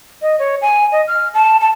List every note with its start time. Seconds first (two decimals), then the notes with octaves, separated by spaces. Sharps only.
0.22 D#5
0.39 C#5
0.62 G#5
0.92 D#5
1.07 F6
1.34 A5
1.61 A5